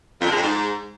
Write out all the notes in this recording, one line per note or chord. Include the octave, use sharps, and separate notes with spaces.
F2
D3
G#3
F2
G#2